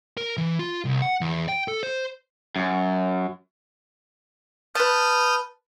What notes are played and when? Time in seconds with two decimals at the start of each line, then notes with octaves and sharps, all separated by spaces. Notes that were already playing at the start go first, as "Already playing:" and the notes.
0.17 A#4
0.37 E3
0.59 F4
0.85 C2
1.02 F#5
1.21 E2
1.48 G5
1.68 A4
1.83 C5
2.56 F#2
4.75 B4 A5 D#6 F6 G6